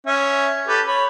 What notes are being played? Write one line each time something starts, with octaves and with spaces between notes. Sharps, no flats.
C#4 E5
G4 A4 B4
C#5 B5